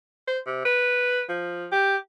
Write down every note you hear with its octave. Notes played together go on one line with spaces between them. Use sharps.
C5
C3
B4
F3
G4